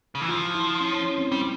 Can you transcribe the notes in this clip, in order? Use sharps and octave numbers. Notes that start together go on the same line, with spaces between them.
C#3
E3
F3 F4
E4
C#4
C#4
C#4
C4
G3 C4